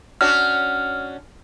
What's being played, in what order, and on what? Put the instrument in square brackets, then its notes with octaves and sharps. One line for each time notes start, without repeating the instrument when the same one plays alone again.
[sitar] C#4 D4 F#4 [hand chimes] F6